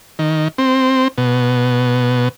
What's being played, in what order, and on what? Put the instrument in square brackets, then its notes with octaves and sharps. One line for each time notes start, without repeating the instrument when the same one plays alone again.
[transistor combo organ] D#3
C4
B2